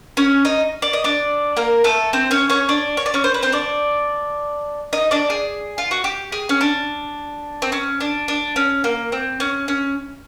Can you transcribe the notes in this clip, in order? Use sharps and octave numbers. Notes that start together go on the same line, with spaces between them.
C#4 C#5
D#4 D#5
D5
D#5
D4 D5
A#3 A#4
A3 A4
C4 C5
C#4 C#5
C#4 C#5
D4 D5
C#5
D5
C#4 C#5
C5
B4
C4 C5
D4 D5
D#4 D#5
D4 D5
G#4
F4
F#4
G4
G#4
C#4
D4
C4
C#4
D4
D4
C#4
A#3
C4
C#4
C#4